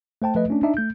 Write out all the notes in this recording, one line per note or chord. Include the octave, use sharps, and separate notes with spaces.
A3 C5 G5 A5
F3 A3 B4 D#5
A3 C#4 D4
D4 D#4 E5
A3 G6